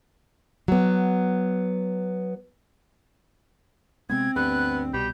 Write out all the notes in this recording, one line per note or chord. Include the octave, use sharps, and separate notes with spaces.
F#3 B3
C3 G#3 B3 C4 G#6
D2 G2 B3 F#6
C2 B2 G3 G6